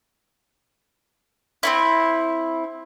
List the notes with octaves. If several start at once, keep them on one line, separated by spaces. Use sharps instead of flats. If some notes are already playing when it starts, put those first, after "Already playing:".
C4 C#4 E4